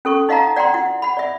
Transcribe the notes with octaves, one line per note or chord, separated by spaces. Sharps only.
C#4 A4 C#6
D#4 D#5 F5 F#5 A#5
D5 F#5 G5 A#5 C6
E4 F#5
F#5 B5
D5 E5